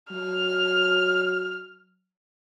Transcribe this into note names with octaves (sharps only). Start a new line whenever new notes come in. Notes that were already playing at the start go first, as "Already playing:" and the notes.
F#3 F6